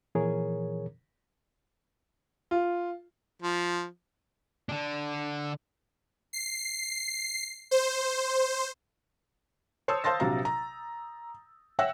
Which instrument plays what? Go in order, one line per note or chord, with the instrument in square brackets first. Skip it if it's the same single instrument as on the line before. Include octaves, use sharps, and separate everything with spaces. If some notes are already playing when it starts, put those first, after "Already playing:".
[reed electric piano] A#2 E3 F3 G#4 A#4 C#5
[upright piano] F4
[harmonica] F3
[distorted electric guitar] D3 D4
[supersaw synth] C7
C5
[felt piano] C5 C#5 A5 D#6 E6
C5 F5 A5 C6 A6 A#6
A#1 C3 F#3 F5 A#5
A#5
C#5 E5 F#5 G5 E6 A#6